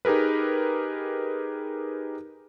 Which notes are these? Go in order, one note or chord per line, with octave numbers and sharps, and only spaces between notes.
D#4 G4 G#4 A#4 B4